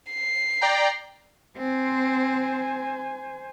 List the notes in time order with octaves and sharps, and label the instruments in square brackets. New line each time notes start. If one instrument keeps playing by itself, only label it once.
[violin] C7
[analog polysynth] D5 G5 A#5
[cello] C4 [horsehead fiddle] C5 G#5